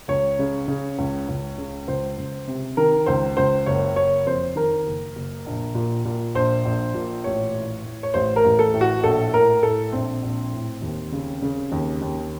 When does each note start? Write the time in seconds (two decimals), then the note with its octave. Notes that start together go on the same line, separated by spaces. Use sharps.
0.08 C#2 C#5
0.39 C#3
0.68 C#3
0.98 C#2
1.28 C#2
1.58 C#3
1.88 C#2 C5
2.17 C#2
2.47 C3
2.77 D#3 A#4
3.06 C#2 C5
3.37 C#2 C5
3.66 F#1 C#5
3.96 F#1 C#5
4.26 F2 C5
4.56 D#3 A#4
4.86 F#1
5.16 F#1
5.46 A#1
5.75 A#2
6.05 A#2
6.35 A#1 C5
6.65 A#1
6.94 A#2
7.24 A1 C#5
7.54 A2
7.84 A2
8.03 C#5
8.14 A1 C5
8.36 A#4
8.44 A1
8.59 A4
8.74 A2
8.81 F#4
9.03 A#1 A4
9.33 A2 A#4
9.63 A2 A4
9.92 A#1 C4
10.23 A#1
10.52 A2
10.82 D#2
11.12 C#3
11.42 C#3
11.72 D#2
12.02 D#2